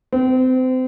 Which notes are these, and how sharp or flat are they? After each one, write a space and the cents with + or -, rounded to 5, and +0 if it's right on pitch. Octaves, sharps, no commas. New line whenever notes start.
C4 -30